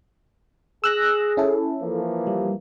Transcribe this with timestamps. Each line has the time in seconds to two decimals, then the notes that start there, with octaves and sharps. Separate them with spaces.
0.84 G#4 E6 F#6 A#6
1.37 C#4 E4 A4
1.80 E3 F3 A#3
2.27 G3